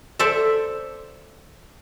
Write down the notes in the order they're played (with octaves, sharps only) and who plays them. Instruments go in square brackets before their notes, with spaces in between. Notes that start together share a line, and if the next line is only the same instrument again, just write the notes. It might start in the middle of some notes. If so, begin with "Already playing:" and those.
[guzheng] A4 C5 D5 E5